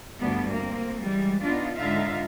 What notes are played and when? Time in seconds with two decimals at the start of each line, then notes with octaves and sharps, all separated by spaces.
0.21 D2 G2 G3 B3 D4
0.53 A#3 C4
0.98 E3 G3 G#3
1.41 B3 D4 D#4 F4
1.78 G#2 D3 D#4 F4 E5 F5